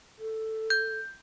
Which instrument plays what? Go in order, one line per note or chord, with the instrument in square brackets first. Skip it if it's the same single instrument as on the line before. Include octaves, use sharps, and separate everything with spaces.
[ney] A4
[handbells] G6